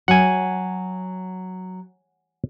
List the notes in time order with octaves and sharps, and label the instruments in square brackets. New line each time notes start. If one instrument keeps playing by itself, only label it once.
[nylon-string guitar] F#3 [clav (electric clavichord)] F#5 G#5